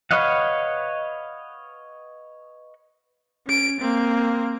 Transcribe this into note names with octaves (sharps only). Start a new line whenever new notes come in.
B4 C#5 D#5 F5 F#5
C#4 D7
A#3 C4